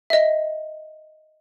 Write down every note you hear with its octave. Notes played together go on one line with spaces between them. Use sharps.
D#5 E5